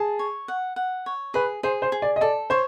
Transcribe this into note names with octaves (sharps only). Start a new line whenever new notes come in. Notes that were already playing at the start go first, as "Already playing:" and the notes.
Already playing: G#4 A5
C#5
F#5
F#5
C#5
G#4 B4
G#4 C5
C5
G#4
D5
D#5
A4 D5
C5 C#5